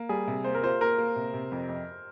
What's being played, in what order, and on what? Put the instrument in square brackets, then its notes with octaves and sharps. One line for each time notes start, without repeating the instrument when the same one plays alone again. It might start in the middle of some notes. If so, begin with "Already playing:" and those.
Already playing: [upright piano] A#3
[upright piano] G3 [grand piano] G#4
[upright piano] C3
[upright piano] A#3 [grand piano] C5
[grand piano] A#4
[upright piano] F4 [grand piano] C5
[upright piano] A#3 [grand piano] A#4
[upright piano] A#3
C3
C3
F2
F2